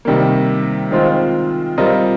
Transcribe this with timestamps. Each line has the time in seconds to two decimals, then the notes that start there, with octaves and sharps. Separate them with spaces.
0.05 C3 D#3 G3 A#3
0.91 D#3 G#3 C4 F4 C5
1.78 G3 C4 F4 A#4 D#5